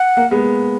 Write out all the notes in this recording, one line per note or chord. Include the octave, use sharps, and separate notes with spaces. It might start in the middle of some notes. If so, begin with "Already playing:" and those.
Already playing: F#5
A#3
G#3 B3